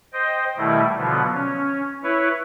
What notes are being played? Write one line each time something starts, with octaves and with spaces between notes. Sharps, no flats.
C5 D#5 G5
B2 D#3 G3 A3 E4
B2 D3 F3 F#3 B3
C#4
E4 B4 C#5